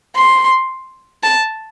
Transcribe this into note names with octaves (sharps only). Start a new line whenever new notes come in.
C6
A5